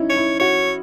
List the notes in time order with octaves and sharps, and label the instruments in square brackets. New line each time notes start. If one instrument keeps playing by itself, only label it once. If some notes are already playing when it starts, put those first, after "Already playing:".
Already playing: [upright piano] C#4 D#4 E4
[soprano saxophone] C#5
[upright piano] E4
[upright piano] F#4 [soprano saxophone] C#5